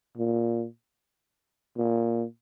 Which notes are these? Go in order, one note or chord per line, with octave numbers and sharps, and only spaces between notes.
A#2
A#2